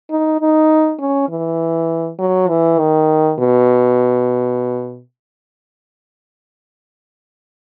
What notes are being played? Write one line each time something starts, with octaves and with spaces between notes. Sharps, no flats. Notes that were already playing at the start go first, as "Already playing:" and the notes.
D#4
D#4
C#4
E3
F#3
E3
D#3
B2